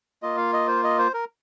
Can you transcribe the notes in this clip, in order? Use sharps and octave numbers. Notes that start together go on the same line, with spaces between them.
A#3 F4 D#5
F5
D#5
C5
D#5
C5
A#4